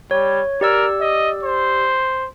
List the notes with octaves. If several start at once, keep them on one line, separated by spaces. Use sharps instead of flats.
G3 C#5
G4 A#4 D5 E6
D#5
C5